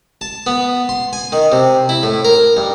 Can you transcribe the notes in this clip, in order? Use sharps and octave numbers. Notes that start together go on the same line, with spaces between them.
A5
B3
C6
G#5
D#3
C3
E4
A2
A#4
G2